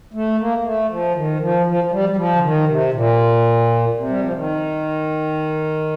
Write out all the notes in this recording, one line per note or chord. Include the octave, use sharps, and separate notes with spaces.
A3
A#3
A#3
A3
F3
D#3
F3
F3
F3
G3
G3
F3
D3
D#3
C3
A#2
C3
G3
F3
D#3